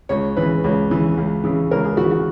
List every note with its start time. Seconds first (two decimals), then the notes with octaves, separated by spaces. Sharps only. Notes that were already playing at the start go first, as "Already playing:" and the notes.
0.09 C#2 C#5
0.37 C#3 E3 B4
0.64 C#2
0.90 C#3 E3
1.17 C#2
1.44 C#3 E3
1.71 C#2 A#4
1.85 G#4
1.97 C#3 E3 F#4
2.11 F#4